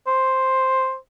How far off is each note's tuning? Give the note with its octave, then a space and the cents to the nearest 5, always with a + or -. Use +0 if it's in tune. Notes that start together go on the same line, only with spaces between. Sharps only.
C5 +5